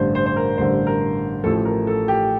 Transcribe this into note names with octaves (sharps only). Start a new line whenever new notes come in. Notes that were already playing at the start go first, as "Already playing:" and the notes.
Already playing: A1 G2 D3 C5
C5
C5
A#4
A1 G2 D3 C5
A#4
A1 A2 F3 A4
A#4
A4
G4